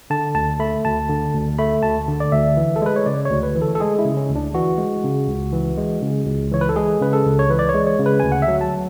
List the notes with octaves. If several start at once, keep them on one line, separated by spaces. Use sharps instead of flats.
D3 A5
D2 A5
A3 B5
D2 A5
D3
D2
A3 B5
D2 A5
D3
D5
D2 E5
E3
A4
G#3 B4
C#5
C#3 D5
C#5
D2
B4
E3
A4
A4
G#3 G#4
E4
C#3
C#4
D2
D4
E3 F#4
G#3
C#3
C#2
E3
G#3
C#3
C#2
E3 C#5
B4
A4
G#3 G#4
C#3 B4
A4
C#2
C#5
E3 B4
D5
C#5
G#3
C#5
C#3
B4
D2 G#5
F#5
E5
F#3
A5